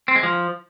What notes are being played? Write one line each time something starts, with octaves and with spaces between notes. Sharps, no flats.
C4
G#3
F3